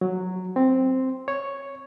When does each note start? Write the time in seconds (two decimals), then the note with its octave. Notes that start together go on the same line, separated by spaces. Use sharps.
0.01 F#3
0.56 C4
1.28 C#5